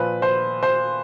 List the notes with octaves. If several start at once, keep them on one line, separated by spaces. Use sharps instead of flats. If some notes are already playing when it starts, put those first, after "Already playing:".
Already playing: A#2 F3 B4
C5
C5